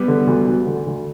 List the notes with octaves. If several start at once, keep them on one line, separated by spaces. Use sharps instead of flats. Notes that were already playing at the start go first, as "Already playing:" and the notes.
Already playing: G3 B3
D3
D2
D2
D3
D2